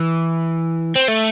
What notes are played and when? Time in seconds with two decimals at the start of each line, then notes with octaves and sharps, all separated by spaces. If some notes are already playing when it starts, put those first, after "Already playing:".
Already playing: E3
0.96 C4
1.08 A3